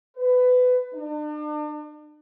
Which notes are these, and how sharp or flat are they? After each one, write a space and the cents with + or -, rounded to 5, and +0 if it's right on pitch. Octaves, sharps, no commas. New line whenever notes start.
B4 +20
D4 +40